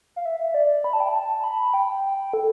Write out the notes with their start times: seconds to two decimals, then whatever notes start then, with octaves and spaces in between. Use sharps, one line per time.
0.16 F5
0.25 E5
0.40 E5
0.54 D5
0.84 B5
0.93 A5
1.00 G5
1.09 A5
1.44 B5
1.74 G5
2.34 A4